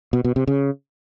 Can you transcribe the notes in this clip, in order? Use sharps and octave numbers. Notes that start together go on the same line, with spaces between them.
B2
B2
C3
C#3